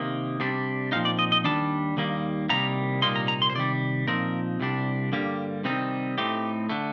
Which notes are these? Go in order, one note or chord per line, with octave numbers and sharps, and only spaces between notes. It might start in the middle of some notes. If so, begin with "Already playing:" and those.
Already playing: C3 D#3 A#3
C3 G3 D4
A#2 F3 C4 D#4 F5
D5
D#5
D#5
D#2 D#3 G3 D4 A5
D#2 D#3 G3 A#3
C2 C3 D#3 G3 A#3 A#5
C2 A#2 G3 A#3 D#4 C6
A#5
A#5
C6
C5
C3 D#3 G3 D5
A#2 F3 C4 D#4 A#4
C2 C3 G3 D4
G2 D3 G3 A#3 G4
C3 D#3 G3 C4 D#4
A2 A3 C4 D#4 G4
D3 A3